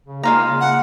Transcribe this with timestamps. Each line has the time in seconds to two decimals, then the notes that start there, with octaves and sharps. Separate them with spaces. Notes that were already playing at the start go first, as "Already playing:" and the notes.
0.07 C#3
0.23 G#3 A#3 F4 A#5
0.44 C#3
0.60 F#5